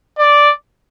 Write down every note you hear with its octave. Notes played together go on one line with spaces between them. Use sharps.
D5